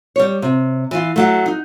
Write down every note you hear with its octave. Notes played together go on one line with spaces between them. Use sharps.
G3 C#5
C3
E3 F4
F#3 A3
D#4